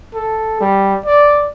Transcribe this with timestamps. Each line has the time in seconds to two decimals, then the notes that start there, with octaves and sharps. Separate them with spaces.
0.15 A4
0.61 G3
1.06 D5